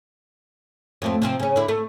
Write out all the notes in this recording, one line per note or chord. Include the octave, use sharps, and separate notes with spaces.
F2 A3 C4
C3 F3 C4
C#3 C#4
D3 E4
A3